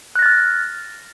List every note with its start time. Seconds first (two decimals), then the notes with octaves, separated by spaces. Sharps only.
0.16 F#6
0.19 A#6
0.22 A6
0.26 F6